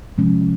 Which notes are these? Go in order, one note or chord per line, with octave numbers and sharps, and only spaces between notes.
C3 F3 G#3 C#4